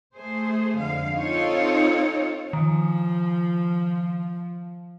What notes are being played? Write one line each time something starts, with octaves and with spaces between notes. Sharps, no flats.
A3 G#4 C5
F2 D3 G#3 F5
C4 D#4 F4 A4 C#5
D#3 F3